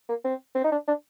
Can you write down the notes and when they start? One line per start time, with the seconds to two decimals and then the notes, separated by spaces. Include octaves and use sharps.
0.09 A#3
0.25 C4
0.55 C4
0.64 D#4
0.72 D4
0.88 D4